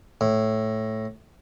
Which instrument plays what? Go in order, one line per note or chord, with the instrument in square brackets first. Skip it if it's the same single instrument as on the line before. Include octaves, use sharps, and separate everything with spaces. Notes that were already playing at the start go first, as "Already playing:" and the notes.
[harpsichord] A2